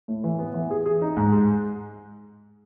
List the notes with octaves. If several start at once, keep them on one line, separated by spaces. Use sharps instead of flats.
A2
E3
B3
E3
G#4
G#4
D#4
G#2
G#3